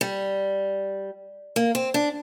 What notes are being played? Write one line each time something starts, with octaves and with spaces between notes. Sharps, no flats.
G3
A#3
C4
D4